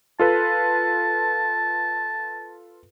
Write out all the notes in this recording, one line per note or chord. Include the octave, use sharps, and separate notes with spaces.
F4 A4 B4 A5